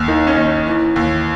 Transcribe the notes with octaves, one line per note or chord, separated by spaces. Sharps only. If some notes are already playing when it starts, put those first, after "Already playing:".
Already playing: D#2
D#3
C#4
D#2 D#4
E3
D#2